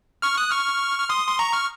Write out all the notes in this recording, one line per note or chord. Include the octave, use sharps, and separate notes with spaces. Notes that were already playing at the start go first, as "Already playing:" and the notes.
C#6 F6
D#6 F#6
C#6 F6
F6
C6 D#6
C6
A#5 C#6
C#6 F6